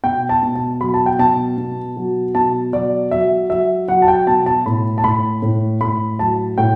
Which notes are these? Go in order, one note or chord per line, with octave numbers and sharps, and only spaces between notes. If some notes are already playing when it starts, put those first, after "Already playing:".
B2 G5
A5
B2
A5
F#3 B5
A5
G5
B2 A5
B2
F#3
B2 A5
F#3 D5
F#3 E5
F#3 E5
F#3 F#5
A5
G5
B2 A5
A5
A2 B5
A5
A2 B5
A2
A2 B5
F#3 A5
A2 G5